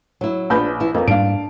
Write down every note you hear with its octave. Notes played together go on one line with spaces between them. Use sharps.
F#3 E4
A#1 B3 D4 B4 B5 G6
E3 E4
F2 A#3 B3
G#2 G3 A#3 D4 F5 D7